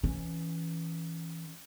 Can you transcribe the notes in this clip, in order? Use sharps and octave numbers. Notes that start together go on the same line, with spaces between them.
E3 C#4